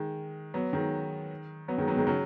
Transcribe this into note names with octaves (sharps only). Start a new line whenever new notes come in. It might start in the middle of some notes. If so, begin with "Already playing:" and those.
Already playing: D#3 G#3
F#3 B3
D#3 G#3
F#3 B3
D#3 G#3
F#3 B3
D#3 G#3
C#3 F#3